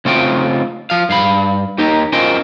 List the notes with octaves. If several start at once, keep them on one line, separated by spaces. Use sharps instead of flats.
C#3 A3 C4 F4 G5
F3 F5
G2 F5 B5
D#2 D#3 D#4 G4
C#4 F4 A#4 C5 D#5 G5